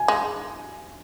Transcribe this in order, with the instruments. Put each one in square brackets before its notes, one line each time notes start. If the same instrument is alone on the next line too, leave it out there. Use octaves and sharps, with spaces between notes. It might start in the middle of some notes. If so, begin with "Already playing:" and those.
Already playing: [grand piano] G#5
[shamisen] G#3